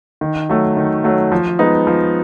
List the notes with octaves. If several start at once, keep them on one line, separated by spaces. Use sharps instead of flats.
D#3
F#3 A3
D#3
F#3 A3
F3
G#3 B3 D#4
F3